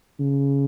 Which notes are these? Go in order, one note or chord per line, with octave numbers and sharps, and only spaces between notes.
C#3